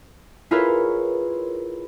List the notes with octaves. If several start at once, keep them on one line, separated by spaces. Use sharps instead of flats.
E4 F4 G#4 A#4 B4 C#5